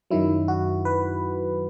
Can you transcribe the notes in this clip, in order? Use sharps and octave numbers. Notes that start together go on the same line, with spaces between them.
F#2 D#3 F#3 E4
F#4
B4